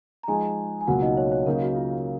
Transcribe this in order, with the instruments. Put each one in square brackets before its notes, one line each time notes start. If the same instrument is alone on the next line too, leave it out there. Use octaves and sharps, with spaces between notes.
[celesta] A#5
[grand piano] F3 G#3 D#4 [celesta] G#4 G#5
[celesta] G#5
[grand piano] C#2 B2 F#3 A#3 F4 [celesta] F#4 F#5
[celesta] D#4 D#5
C#5
C#5
[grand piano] C#3 F#3 A#3 D#4 [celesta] A#4
[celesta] F#4
F4